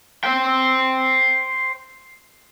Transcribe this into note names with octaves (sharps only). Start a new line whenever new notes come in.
C5 G5